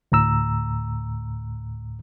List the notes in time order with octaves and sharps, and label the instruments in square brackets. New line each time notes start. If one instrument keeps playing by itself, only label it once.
[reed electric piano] D2 A2 A#5 E6